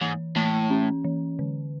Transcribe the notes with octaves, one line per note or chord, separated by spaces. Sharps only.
G#2 E3
A2 E3
C#4
E3
D3